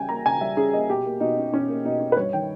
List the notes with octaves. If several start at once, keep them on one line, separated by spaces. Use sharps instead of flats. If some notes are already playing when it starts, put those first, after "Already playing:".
Already playing: C#3 G3 C#4 G5 G#5
A#3 A#5
C#3 G#5
G3 E5
C#4 G#4
A#3 D#5
B2 G4
A#3
B2 D#4
C#4
B2 C#4
A#3
B2 D#4
C#4
B4
G2 C#5
D#3 G5